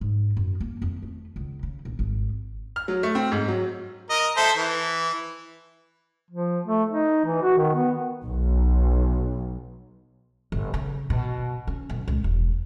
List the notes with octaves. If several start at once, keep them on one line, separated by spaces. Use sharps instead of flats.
G#2
F#2
A#3
F2
A3
C#2
C#3
A#1
G#1
F6
F#3
A3
C4
G#2
F#3
A#4 D#5
A4 C5 E5
E3
F3
A3
D#4
E3
F#4
D#3
B3
B1
G1
C#3
B2
C#4
B1
C#2
E1